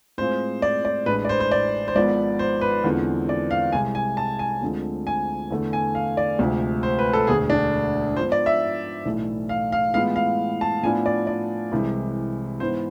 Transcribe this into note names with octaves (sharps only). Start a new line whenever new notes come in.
A2 G#3 C4 F4 G#4 C5
D5
D5
A1 A2 G#3 D4 B4
D5
C5
C5
D5
C5
G#1 G#2 F3 B3 D5
C5
B4
E2 D3 F3 G#3 C4
D5
F5
C2 C3 G#3 G#5
G#5
A5
G#5
D2 D3 F3 G#3 C4
G#5
E2 D3 A3
G#5
F5
D5
D2 C3 F3 G#3
C5
B4
A4
E1 D2 D3 G#4
D4
G#2 F3 B3 C5
D5
E5
B1 A2 E3 A3
F5
F5
A2 E3 G#3 B3 F4 F5
F5
A5
A2 F3 B3 D4 F4 G#5
D5
D5
C2 C3 E3 G#3
G#2 E3 B3 E4 C5